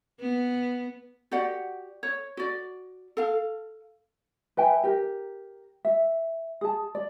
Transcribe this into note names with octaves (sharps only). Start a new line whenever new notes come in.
B3
F#4 G4 D5 F#5
C#5
F#4 D5
A4 F5
B4 E5 G5 G#5
G4 A#4
E5
G#4 A5
D5